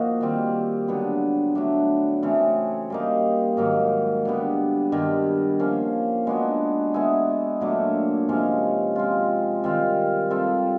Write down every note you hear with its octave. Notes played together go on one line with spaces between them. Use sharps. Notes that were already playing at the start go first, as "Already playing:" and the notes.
Already playing: F3 A#3 D#4 F#4
D#3 G3 C4
D3 F#3 B3
F#3 A3 D4
C#3 E3 A3 C4
G3 A#3 D#4
G#2 D#3 F#3 A#3
D3 G3 B3
G2 D#3 G3
F3 A#3 C#4
G#3 B3 D4 F#4
G#3 B3 E4 G#4
A#2 F#3 A3 D4
C3 F3 G#3 C#4
G#3 C4 F4
D#3 G3 C4 F4
G3 C4 F4 A4